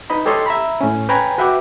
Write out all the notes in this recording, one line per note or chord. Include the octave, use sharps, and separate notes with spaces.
D#4 B4 D#5 B5
G4 A4 C#5 D#5 C6
E5 A#5 B5
A2 C#4
B4 C#5 G5 G#5 A#5 B5
F#4 B4 E5 F#5 G5 D6